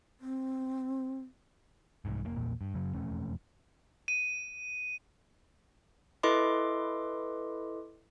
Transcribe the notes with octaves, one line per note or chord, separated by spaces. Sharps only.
C4
C2 G#2
F1 G#2 A#3
A#1 E2 A#2 A#3
G2
F#2 C#3 F#3
E1 F2 A3 C#4
D#7
E4 A4 B4 D#5 C6 D6